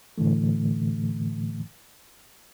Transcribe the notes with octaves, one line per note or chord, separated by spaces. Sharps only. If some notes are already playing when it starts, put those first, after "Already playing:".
A2 D3 E3 A3